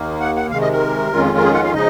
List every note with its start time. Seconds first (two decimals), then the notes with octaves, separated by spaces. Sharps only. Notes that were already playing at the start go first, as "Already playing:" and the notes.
Already playing: D#2 D#3 A#3
0.20 F#5
0.36 F#5
0.51 C3 D#3 G#3 F5
0.61 D#5
0.72 A#4
1.13 F2 D#3 G#3 C#4 F4
1.38 A#4
1.43 G#4
1.54 F#5
1.64 F5
1.74 C#3 F3 G#3 D#4 D#5